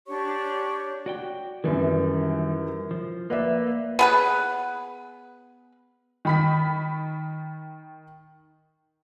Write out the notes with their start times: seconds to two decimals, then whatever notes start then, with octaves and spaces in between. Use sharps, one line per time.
0.06 D4 G4 C#5 C#6
1.06 F#4 D5 G5
1.64 F#2 D#3 E3 G3
2.91 F3
3.30 A#3 B4 D5 E5
3.99 B3 G#4 B4
6.25 D#3 B5 B6